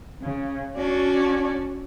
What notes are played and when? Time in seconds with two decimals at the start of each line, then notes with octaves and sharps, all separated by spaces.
0.21 C#3
0.77 C#4 D4 F#4 D5